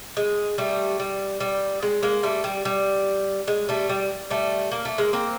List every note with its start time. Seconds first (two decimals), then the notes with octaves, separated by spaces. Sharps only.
0.17 G#3
0.58 G3 A3
1.00 G3
1.40 G3
1.82 G#3
2.03 G#3 A#3
2.23 G3 A3
2.44 G3
2.65 G3
3.48 G#3
3.69 G3 A3
3.89 G3
4.30 G3 A3
4.72 A#3
4.85 A3
4.98 G#3 A#3
5.13 A#3 C4